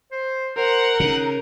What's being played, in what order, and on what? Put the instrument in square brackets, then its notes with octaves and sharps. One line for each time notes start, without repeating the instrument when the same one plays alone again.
[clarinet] C5
[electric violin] A#4 [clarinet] C5 [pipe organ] F#5
[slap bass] C#3 [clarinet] D#4